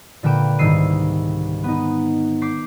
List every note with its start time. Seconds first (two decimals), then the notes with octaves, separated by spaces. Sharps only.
0.23 A#2 D3 A#3 B4 G5 E7
0.59 C2 G#2 D#3 E6 C7 D#7
1.64 B3 D#4
2.42 D6 G6 B6 C7